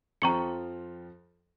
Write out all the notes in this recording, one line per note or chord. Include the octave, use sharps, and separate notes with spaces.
F2 F3 G5 A#5 C#6 C#7